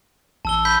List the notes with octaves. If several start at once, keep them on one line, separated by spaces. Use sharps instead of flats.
A1 A5 E6 G7
B5 G6 B6